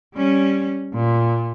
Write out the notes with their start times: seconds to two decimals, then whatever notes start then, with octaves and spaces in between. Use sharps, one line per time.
0.15 G3 C#4
0.93 A#2